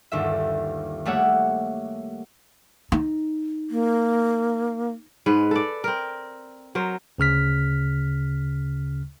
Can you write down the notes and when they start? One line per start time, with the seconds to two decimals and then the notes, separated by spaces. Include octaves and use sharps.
0.12 G1 D#2 E5
1.05 G3 A3 A#3 C#5 E5 F#5
2.92 D#4
3.70 A#3
5.26 G#2 G#3 B4
5.51 A4 D5
5.84 C4 A#4
6.75 F#3 A#4 C5
7.18 D2 C#3 F6 B6